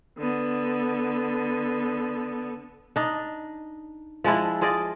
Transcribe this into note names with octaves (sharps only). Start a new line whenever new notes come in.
D3 B3
D4 D#4
F3 G#3 D4 E4
F4 G#4 D5 D#5